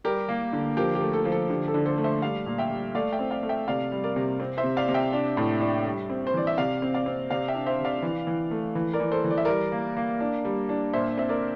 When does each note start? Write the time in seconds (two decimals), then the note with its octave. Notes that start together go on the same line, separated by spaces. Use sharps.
0.04 G3 G4 A#4
0.29 A#3
0.53 D3
0.77 F3 G4 A#4
0.95 G4
1.01 A3
1.13 A4
1.25 F3
1.32 A4
1.50 D3 G4
1.68 A4
1.74 D3
1.86 A4 C5
1.98 A3
2.04 C5 E5
2.22 G3 D5 F5
2.46 A#2
2.58 E5 G5
2.70 G3
2.95 A3 D5 F5
3.12 E5 G5
3.19 C4
3.31 D5 F5
3.43 A3
3.49 E5 G5
3.68 C3 D5 F5
3.92 G3
4.04 A#4 D5
4.16 C3
4.40 C4
4.58 C5 E5
4.64 C3
4.77 D5 F5
4.89 C3
4.94 E5 G5
5.13 D4
5.37 A2
5.61 D4
5.85 G3
6.10 C4
6.27 C5
6.34 E3 D5
6.47 E5
6.57 C3 D5 F5
6.82 C4
6.94 D5 F5
7.06 C4
7.30 C3 D5 F5
7.48 E5 G5
7.54 D4
7.66 C5 E5
7.79 C3
7.85 D5 F5
8.03 E3
8.27 E3
8.51 A3
8.75 E3
8.93 A#4 D5
9.00 E3
9.12 A4 C5
9.24 E3
9.30 D5
9.38 E5
9.45 G3 A#4 D5
9.72 A#3
9.97 A#3
10.20 D4
10.45 G3
10.69 D4
10.93 A#2 C5 E5
11.18 C4 E5
11.29 A#4 D5